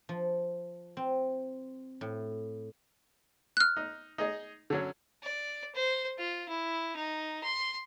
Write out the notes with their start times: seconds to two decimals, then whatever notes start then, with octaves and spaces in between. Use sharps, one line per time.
0.09 F3
0.97 C4
2.01 A2
3.57 F6 F#6
3.77 D#4
4.18 D#4 G#4 D#5
4.70 D3 F#3 C#4
5.23 D5
5.75 C5
6.18 F4
6.48 E4
6.96 D#4
7.43 C6